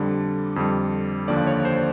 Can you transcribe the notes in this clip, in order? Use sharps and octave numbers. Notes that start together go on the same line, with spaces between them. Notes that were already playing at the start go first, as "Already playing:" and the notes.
Already playing: F2 D3 G3
F2 D3 G3
D#2 D3 F3 D5
C#5
C5